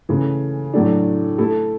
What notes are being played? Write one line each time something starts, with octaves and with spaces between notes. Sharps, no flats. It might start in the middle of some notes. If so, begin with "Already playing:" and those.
C#3 E3 A3
A2 F#3 A3 D4
A3 E4 A4